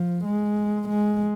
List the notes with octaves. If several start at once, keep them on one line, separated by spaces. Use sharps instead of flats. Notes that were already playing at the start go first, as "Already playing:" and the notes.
Already playing: F3
G#3
G#3